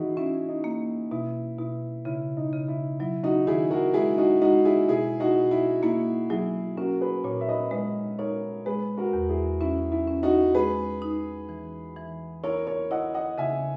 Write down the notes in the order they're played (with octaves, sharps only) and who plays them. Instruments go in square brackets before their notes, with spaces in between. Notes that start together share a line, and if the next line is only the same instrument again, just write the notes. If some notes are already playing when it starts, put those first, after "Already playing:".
Already playing: [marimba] E3 [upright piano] D#4 E4 F#4 G#4
[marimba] C#4 [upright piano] E4
[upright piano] D#4
[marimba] A#3
[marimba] B2 [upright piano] E4
[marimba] B2 [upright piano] E4
[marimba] C#3 [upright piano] E4
[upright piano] D#4
[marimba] C#3
[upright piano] E4
[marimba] F#3 [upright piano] E4
[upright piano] D#4 F#4
[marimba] D#3 [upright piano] E4 G#4
[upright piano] F#4 A#4
[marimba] G#3 [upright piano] E4 G#4
[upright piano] D#4 F#4
[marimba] G#3 [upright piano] D#4 F#4
[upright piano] E4 G#4
[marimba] B2 [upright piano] E4 G#4
[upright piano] D#4 F#4
[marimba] B2
[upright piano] E4
[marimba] A#3 [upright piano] E4
[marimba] F#3 [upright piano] E4 G#4
[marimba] C#4 [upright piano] F#4 A#4
[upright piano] G#4 B4
[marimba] A#2 [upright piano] A#4 C#5
[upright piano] E5
B4 D#5
[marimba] G#3 [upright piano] B4 D#5
[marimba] D#4 [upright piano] A#4 C#5
[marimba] G#3 [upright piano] G#4 B4
[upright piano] F#4 A#4
[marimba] E2
[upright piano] E4 G#4
[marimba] C#4 [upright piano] E4
[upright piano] E4
[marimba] C#4
[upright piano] D#4 F#4
[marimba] G#3 [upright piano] G#4 B4
[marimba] D#4
E3
E3
[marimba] E4 [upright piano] A#4 C#5
[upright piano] A#4 C#5
[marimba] E4 [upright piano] D#5 F#5
[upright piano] D#5 F#5
[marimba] C#3 [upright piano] E5 G#5